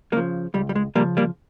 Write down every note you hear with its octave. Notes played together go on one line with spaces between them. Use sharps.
C#3 F3 G3 A#3
C#2 G3
G3
G#3
C#3 F3 G3 A#3
G3 A#3